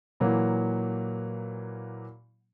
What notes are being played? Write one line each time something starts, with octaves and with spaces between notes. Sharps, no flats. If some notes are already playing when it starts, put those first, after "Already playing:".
A#2 E3 F#3 A#3